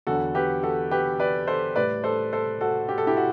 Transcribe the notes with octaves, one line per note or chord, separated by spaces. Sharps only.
E2 D3 F#3 F#4 A4
G4 B4
F#4 A4
G4 B4
B4 D5
A4 C5
A2 G3 B4 D5
A4 C5
A4 C5
F#4 A4
G4
A4
E4 G4
F#4